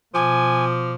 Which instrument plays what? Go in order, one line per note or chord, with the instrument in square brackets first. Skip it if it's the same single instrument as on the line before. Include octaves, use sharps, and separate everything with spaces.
[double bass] B2 [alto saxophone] F3 [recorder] G#5 [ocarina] D6